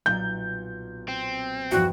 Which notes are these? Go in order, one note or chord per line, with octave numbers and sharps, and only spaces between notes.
B1 A#2 G6
C4
E2 G2 F3 F#4 G5